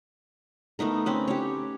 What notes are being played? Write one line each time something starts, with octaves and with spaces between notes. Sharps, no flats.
A3 B3 D#4 A#4
C4 C#4 B4
G4 C#5